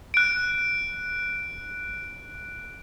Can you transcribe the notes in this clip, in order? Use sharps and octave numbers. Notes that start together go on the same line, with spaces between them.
F#6 D7